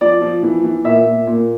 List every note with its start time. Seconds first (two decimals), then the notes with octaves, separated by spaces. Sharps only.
0.01 F3 D5
0.22 F3
0.43 E3
0.64 E3
0.84 A#2 E5
1.06 A#2
1.27 A#2